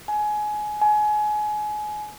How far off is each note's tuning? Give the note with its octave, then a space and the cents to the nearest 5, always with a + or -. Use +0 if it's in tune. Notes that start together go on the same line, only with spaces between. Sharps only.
G#5 +20
G#5 +25